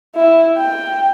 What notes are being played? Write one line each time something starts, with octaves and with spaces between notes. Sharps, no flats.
E4
G5